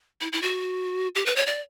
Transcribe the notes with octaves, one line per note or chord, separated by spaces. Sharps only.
E4
E4
F#4
G4
B4
C#5
D5